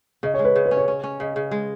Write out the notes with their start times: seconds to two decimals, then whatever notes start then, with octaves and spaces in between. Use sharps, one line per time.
0.23 C#3 D#5
0.34 C#5
0.39 G#3
0.45 B4
0.56 C#3
0.66 B4
0.71 C#4
0.77 C#5
0.88 C#4
1.04 C#4
1.20 C#3 D#5
1.36 C#3
1.51 G#3